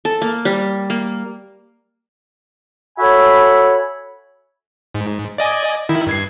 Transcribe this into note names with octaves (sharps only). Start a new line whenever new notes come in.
A4
A#3
G3
A#3
F#4 A4 C#5 E5 G#5 B5
G#2
D5 D#5 G#5
D#3 E4
G2 G#6 C7